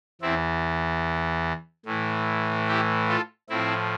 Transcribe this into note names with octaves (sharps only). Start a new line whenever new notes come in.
E2 E3 C4 E4
A2 E3
E4 G4
F4 A4
A2 F3 C4 E4